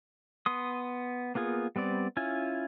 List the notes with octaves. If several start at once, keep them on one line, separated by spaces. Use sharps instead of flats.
B3 C6 D#6
A#3 B3 F4 G#4
G3 B3 C4 D5
C#4 E4 F4 G#5